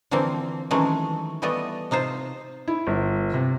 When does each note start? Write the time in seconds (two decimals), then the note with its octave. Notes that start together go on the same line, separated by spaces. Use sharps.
0.11 D3 E3 F3 A#3 C4
0.71 D#3 E3 F#3 G#3 A3 C#4
1.42 E3 G3 A3 B3 A4 D#5
1.91 C3 D#4 F4 C5
2.68 E4
2.87 G1
3.34 C3